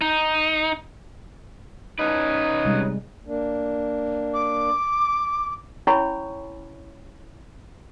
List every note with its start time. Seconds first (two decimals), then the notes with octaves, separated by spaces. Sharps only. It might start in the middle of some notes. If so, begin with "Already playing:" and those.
0.01 D#4
1.99 C#4 D#4 B4
2.65 C3 G3 G#3
3.26 A#3 D4
4.34 D6
5.87 C#4 E4 C#5 G#5 B5 C#6